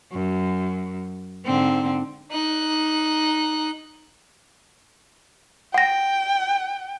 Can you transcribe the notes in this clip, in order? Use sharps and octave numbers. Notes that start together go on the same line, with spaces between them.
F#2
G#2 D3 C4
D#4 F#6
F#5 G5 A#6